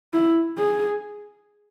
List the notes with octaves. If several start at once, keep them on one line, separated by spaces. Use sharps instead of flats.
E4
G#4